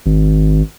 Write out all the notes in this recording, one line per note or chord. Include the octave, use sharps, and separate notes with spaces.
G#1